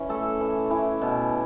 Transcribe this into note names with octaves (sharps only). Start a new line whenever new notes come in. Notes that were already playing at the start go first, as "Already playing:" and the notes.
Already playing: E3 C#4
A3 A4
E3
E3
B2